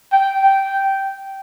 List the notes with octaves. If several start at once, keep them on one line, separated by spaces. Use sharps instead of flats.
G5
G5